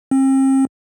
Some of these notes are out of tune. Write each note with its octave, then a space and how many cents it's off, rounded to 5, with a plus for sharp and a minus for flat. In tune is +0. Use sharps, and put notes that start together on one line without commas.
C4 +40